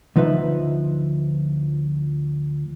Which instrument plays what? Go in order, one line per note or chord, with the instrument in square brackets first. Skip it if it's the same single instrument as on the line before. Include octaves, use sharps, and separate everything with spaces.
[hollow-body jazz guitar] D2 F3 D#4 B4 E5